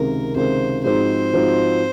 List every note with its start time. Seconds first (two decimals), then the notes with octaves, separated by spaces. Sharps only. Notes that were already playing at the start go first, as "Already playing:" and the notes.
Already playing: C#2 C3 D#3 A#4
0.35 C#2 C3 D#3 C5
0.84 G#2 F3 C4 D#4 F#4 C5
1.33 G#2 F3 C4 D#4 F#4